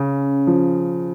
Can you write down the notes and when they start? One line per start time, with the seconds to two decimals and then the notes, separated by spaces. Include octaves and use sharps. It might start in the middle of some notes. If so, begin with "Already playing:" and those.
Already playing: C#3 C#4
0.47 F3